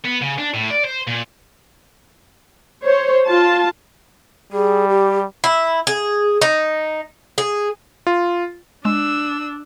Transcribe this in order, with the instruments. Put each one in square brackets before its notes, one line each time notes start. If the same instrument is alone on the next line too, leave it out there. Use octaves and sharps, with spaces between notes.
[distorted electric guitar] B3
C#3
D4
A2
D5
C5
A#2
[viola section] C5 C#5
F4 A5
[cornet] G3 [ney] G#4
[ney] G4
[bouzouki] E4
G#4
D#4
G#4
[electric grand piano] F4
[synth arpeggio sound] G#3 [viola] D4 [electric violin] E6